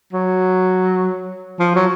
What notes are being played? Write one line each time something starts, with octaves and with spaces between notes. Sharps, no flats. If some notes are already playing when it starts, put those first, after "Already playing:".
F#3
F3
F#3